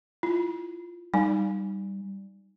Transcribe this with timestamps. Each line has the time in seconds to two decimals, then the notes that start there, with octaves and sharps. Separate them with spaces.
0.23 E4 F4
1.14 G3 D#4 A4 F5 G#5